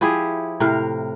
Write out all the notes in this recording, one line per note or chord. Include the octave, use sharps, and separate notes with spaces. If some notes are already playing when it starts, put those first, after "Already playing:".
F3 E4 G4 G#4
A2 C3 A#4 F5